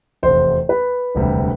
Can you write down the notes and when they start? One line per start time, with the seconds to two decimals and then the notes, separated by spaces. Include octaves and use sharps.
0.23 F1 E2 C3 C5
0.69 B4
1.15 E1 D2 C3 G3